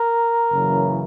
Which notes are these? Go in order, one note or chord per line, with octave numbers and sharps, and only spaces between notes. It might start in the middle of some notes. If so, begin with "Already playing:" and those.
Already playing: A#4
F#1 F#2 C#3 E3